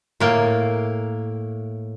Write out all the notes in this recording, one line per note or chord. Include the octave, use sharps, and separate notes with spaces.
A2 A#3 G5